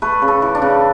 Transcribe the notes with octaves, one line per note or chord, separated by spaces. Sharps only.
A3 B4
C#3
A4
E3
D4
C#3